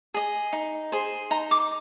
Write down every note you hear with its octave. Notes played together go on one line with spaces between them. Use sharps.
G#4 D#5
D#4
G#4 C5
D#4 A#5
D6